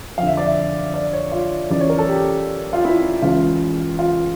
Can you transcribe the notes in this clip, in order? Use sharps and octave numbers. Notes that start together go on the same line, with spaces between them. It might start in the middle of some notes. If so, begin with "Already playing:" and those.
F2 D3 F5
E5
D5
E5
D5
C#5
F4
E2 C#3 E3 D5
C#5
A#4
A4
G4
F4
E4
C#2 C#3 E3 F4
F4